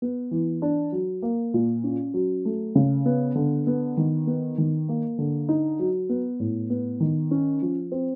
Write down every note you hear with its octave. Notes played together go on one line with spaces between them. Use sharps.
B3
E3
D4
F#3
A#3
A#2
C#4
F#3
A3
C#3
B3
D3
B3
D#3
B3
D#3
A#3
D3
D#4
F#3
B3
A2
B3
D#3
C#4
F3
C4